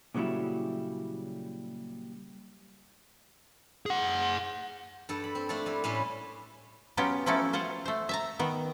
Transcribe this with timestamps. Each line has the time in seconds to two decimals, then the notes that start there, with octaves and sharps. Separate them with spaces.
0.15 A#2 C#3 F#3 G3 E4
3.86 G#4 F#5
5.09 G2 A4
5.24 B5
5.35 C4
5.49 A3 D4 F4 A4
5.66 G3 E4
5.84 A2 G3 C#4 B4 C6
6.97 F#3 B3 C#4 F4 G4
7.26 F3 F#3 A3 C#4 E4 A4
7.53 F4 C5 F5 F#5
7.85 A3 C5
8.09 E5 A5 A#5
8.39 D#3 B3